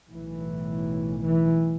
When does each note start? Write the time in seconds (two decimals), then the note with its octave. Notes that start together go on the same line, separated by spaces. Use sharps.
0.11 B1 A2 E3
1.23 E3